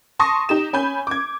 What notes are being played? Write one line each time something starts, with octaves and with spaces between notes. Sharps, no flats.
A5 C6 C#6 D#6 A#6
D#4 G4 E7
C#4 G#5 B5 G6
D6 G#6